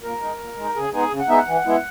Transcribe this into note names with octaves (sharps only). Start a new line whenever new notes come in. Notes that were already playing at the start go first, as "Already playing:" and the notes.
A#2 A#4
G#3 D#4
A#2
G#3 D#4
C#3 G#4
G#3 B3 D#4 G#4
C#3
F#5
G#3 B3 D#4 E5
F#5
E3
G#3 B3 E4